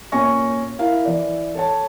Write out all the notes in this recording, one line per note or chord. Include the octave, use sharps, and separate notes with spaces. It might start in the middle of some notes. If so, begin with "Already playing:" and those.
A#2 C#4 G#5 C#6 A#6
E4 A#4 F5
E3 D5
A4 C#5 A5